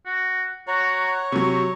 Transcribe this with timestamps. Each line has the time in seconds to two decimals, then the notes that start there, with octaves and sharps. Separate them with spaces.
0.06 F#4
0.67 F#4 C#5 A#5
1.32 C3 F#3 C#6